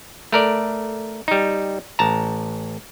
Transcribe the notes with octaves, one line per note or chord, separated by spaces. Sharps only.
A3 A#4 D5
G3 D#4
A1 A5 A#5